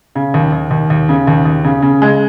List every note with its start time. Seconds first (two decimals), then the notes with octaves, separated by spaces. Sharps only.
0.15 C#3
0.34 D#2
0.52 D#2
0.71 D#2
0.90 D#2
1.09 C#3
1.27 D#2
1.46 D#2
1.64 C#3
1.82 C#3
2.02 G#3